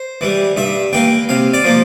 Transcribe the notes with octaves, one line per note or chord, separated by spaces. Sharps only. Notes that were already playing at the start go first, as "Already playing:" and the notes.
Already playing: C5
E3 G3
G2 E5
E3 A#3 G5
C3 F5
D5
F3 A#3